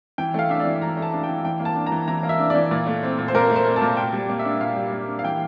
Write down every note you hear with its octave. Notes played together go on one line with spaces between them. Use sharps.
E3 G5
A3 F5
D4 E5
D5
E3
E3 A#5
A3
A5
D4
G5
E3
E3 G5
A#3
A5
D4
A#5
E3
E3 A#5
A#3
E5
D4
E3 D5
A#2
A3
C4
A#2
C5
A#2 A#4
A3
C5
C4
A5
A#2
A#2 G5
G3
A#3
E5
D4
A#2 F5
G3
A#3
D4
F5
E3 G5